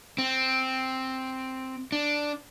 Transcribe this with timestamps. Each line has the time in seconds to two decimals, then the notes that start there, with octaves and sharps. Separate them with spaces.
0.18 C4
1.92 D4